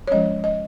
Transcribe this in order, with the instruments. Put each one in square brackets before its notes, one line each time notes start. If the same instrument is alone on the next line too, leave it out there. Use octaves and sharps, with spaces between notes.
[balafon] C#5
F3 G#3 C#4 D#5
D#5